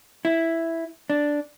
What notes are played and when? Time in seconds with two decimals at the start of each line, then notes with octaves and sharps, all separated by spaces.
0.25 E4
1.10 D4